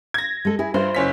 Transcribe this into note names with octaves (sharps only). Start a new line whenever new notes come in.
G#6 A#6
G#3 A4
E4 G#4
G2 F4 C5
F#1 C#4 B6